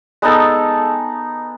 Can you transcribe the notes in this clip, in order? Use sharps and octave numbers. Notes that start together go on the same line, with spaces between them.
G#3 B3 D#4 A4